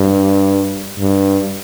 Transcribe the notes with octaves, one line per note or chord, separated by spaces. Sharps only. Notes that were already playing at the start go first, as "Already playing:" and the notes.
Already playing: G2
G2